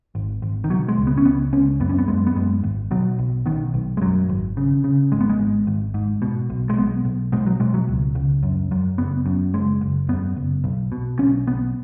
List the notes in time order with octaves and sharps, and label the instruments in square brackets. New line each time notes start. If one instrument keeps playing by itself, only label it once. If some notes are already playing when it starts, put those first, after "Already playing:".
[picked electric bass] G#1
G#1
D#3
B2 F#3
G#3
C#2
B3
C#4
C#2 B3
C#2 C#4
F#2 B3
C#4
B3
F#2 G#3
B3
F#2 G#3
G#1
B2 F#3
B1
B2 D#3
B1
G#3
F#2 F#3
G#1
C#3
C#3
G#1 G#3
B3
G#3
G#1
G#1
G#2
B2
B1
G#3
B1 B3
B1
B2 G#3
F#3
B2 G#3
F#3
C#2
C#2
F#2
F#2
F#1 B3
F#2
F#1 G#3
F#1
F#2 B3
F#1
B1
B2
B1 C#4
B1 B3